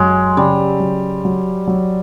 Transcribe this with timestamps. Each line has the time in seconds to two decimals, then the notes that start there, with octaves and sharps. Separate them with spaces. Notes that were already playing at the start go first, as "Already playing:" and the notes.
Already playing: F#2 F#3 G#3
0.37 C#3 G3
0.80 F#3
1.25 F#3
1.67 F#3